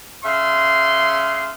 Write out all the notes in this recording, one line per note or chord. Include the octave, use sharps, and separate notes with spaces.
C#3 E5 C6